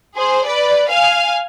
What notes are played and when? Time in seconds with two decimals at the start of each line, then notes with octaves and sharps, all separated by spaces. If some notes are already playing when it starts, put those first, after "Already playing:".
0.16 G#4 C5
0.46 B4 D5
0.90 F5 G#5